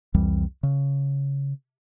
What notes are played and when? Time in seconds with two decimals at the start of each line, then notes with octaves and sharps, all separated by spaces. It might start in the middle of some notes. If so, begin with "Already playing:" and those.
0.14 C2 F2 E3 G3
0.63 C#3